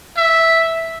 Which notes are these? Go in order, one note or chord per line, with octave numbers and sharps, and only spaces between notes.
E5